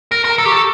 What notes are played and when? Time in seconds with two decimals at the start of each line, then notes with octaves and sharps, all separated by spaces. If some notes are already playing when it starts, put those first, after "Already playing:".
0.12 A#4 A#6
0.25 A#4
0.30 A#5
0.38 A4
0.45 G4 C#6
0.52 A4